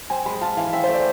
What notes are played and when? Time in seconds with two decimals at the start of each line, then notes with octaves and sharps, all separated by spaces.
0.10 C4 G#5
0.26 G#3 B5
0.41 F4 A5
0.57 E3 F5
0.73 C4 E5
0.84 C5
0.89 A3
0.94 D5